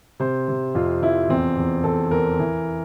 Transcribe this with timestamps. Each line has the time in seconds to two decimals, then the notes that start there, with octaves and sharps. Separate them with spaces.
0.20 C3 C5
0.48 C3
0.75 F2 F4
1.02 F2 E4
1.29 E2 C4
1.57 E2
1.84 E2 A4
2.11 E2 A#4
2.39 E3